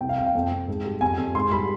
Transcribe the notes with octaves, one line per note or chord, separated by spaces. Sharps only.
C2 G5
F5
C2 G5
F5
F2 G5
F2
G#2
G3
F2 G#5
F2
G#2 C6
G3 B5